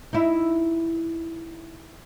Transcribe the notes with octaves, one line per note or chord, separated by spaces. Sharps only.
D#4 E4